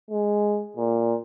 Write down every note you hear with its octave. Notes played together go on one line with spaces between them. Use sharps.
G#3
A#2